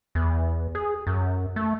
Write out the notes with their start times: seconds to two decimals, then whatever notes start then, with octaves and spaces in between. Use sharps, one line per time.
0.15 E2
0.75 G#4
1.07 F#2
1.56 A3